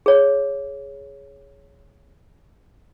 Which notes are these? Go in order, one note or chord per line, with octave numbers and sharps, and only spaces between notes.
G#4 C#5